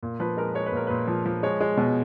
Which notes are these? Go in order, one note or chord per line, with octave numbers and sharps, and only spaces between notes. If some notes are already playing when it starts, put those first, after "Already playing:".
A#2
F3 B4
G#3 A#4
G#3 C#5
B4
A#2 A#4
A#2 B4
F3
F3
G#3 C#5
G#3
B2